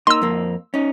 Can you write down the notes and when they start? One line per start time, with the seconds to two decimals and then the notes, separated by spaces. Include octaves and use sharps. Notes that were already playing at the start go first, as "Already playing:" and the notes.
0.07 A#3 D#4 C6 E6
0.22 F2 A#3
0.74 C#4 D#4